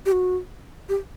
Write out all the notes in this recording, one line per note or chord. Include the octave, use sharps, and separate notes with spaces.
G4
F#4
G4